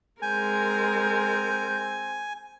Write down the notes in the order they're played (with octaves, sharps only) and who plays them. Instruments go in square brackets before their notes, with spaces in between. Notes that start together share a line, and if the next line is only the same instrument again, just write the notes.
[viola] G#3 A#4 [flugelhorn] C4 [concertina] G#5 [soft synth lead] G6